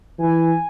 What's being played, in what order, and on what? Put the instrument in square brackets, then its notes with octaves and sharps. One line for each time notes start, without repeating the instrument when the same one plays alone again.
[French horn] E3 [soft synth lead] G#5